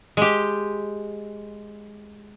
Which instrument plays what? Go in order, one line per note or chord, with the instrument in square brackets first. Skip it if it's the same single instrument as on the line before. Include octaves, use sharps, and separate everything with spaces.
[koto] G#3 G4